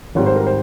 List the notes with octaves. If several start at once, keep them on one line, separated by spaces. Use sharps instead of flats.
G#1 G#2 G3 C4 C#5
C5
A#4
C5